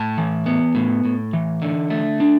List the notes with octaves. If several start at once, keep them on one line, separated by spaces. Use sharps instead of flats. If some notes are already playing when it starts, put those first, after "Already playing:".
Already playing: A2 A5
E3
B3
A2
A2
E3
D3
A3
D4